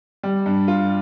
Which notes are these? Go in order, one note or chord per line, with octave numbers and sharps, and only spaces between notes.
G3
G2
F4